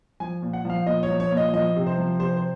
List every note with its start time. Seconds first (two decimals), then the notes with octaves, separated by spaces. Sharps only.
0.20 F3 G#5
0.42 A#2
0.53 F#5
0.65 F3 F5
0.86 A#2 D#5
1.03 C#5
1.08 F3
1.20 C#5
1.31 A#2
1.37 D#5
1.53 F3 D#5
1.76 C3
1.87 C5
1.98 F3
2.20 C3 C5
2.37 C5